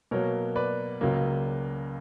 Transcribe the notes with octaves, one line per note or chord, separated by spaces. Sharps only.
B2 F#3 A#3 A#4 C#5
B4 D5
C#2 C#3 F#3 A#3